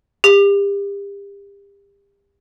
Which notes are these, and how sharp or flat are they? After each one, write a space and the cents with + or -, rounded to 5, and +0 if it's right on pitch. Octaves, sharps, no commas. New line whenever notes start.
G4 +35